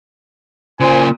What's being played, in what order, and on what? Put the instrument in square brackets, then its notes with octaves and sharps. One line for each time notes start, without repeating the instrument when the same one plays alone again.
[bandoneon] A#2 [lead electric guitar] C#3 A#3 [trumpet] C5 [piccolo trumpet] G#5